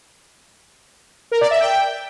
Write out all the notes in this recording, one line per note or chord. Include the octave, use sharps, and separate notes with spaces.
A#4
D5
E5
G5